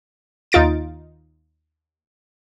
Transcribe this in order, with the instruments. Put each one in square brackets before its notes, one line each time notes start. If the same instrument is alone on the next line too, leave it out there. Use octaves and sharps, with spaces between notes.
[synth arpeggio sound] D#2 D#4 F4 A6 D7